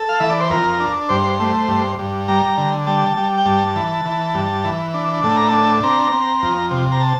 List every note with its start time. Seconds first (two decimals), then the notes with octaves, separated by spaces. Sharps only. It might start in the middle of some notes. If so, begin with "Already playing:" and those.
Already playing: A4
0.09 F5
0.20 E3 E5
0.30 D5
0.40 C5
0.50 F2 A#4
0.80 D4
1.09 G2 C5
1.40 A3
1.68 G2
1.99 G2
2.28 G3 A#5
2.58 D3
2.87 G3 A5
3.17 G3
3.38 G5
3.45 G2 A5
3.76 E3
4.05 E3
4.34 G2
4.64 E3
4.94 D4
5.24 A2 A5
5.36 A#5
5.49 D4 A5
5.83 C4 A#5
6.12 C4
6.42 F2
6.71 C3
6.92 A#5
7.00 A5